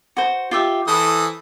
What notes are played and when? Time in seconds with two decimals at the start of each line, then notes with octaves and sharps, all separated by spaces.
0.17 F#4 C5
0.51 F4 G4 E5
0.88 E3 A4 C5 D#6